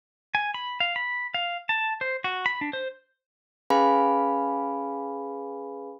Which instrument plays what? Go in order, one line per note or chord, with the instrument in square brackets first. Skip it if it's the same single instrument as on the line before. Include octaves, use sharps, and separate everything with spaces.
[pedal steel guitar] G#5
B5
F5
B5
F5
A5
C5
F#4
B5
D4
C5
[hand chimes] C#4 G#4 B4 F5 G#5 B5